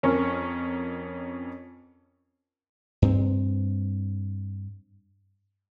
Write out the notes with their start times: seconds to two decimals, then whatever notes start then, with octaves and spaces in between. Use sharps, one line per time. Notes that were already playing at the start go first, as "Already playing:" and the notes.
0.03 F2 C#4 A#4 C#6
3.02 G2 C4